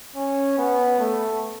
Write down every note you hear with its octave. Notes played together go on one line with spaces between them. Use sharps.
C#4
B3
A3